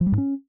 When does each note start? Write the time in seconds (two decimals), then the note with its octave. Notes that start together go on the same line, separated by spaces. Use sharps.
0.01 F3
0.06 G3
0.12 G#2
0.18 C#4